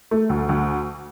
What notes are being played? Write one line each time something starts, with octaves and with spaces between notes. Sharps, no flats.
A3
D2
D2